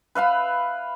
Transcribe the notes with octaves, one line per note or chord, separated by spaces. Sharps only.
B4 E5 F5 B5